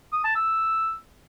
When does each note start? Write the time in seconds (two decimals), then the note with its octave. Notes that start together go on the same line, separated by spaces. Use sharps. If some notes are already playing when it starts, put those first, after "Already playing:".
0.12 D#6
0.24 A5
0.35 E6